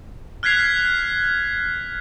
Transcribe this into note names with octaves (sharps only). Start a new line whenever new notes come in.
F6 F#6 G#6 B6 C7 F7